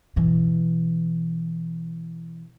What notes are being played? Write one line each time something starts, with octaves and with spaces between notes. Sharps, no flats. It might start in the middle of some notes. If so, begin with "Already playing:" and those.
B2 E3